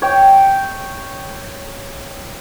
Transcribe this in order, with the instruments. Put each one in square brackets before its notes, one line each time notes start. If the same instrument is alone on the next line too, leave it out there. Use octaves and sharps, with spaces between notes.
[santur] C#5 G5